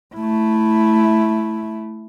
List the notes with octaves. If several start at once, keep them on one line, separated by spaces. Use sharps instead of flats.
A3 E4